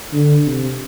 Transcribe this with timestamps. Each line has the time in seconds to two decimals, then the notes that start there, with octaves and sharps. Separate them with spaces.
0.13 D3
0.46 C3